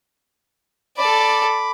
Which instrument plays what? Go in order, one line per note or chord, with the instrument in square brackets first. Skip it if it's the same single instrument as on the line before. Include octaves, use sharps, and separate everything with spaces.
[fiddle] A4 D5 [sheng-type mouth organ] B5 D6